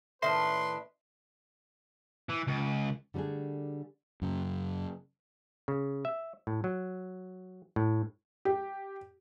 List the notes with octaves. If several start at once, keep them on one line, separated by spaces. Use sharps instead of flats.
A2 D#3 C#4 D4 B4 E5 C6
E3
C#2
D3 G3 A3 D4 G#4
F#2 C#3
C#3
E5
A2
F#3
A2
G4